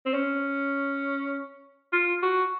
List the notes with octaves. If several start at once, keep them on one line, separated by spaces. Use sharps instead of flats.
C4
C#4
F4
F#4